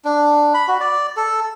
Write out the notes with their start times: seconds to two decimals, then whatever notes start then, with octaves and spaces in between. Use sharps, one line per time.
0.05 D4
0.54 B5
0.68 F#4
0.80 D5
1.17 A4